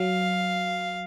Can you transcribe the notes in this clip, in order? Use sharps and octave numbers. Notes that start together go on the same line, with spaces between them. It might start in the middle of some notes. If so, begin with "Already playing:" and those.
Already playing: F#3 F5